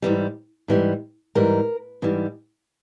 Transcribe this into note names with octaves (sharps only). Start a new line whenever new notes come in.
G#2 E3 G3
G#2 E3 G3
G#2 E3 G3 A#4
G#2 E3 G3